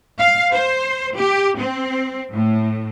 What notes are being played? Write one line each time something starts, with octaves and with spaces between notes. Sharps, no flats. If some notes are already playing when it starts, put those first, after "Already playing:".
F5
C5
G4
C4
A2